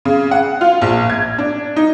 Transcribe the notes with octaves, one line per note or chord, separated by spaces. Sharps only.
C#3
F#5
F4
A#1
G#6
D4
D#4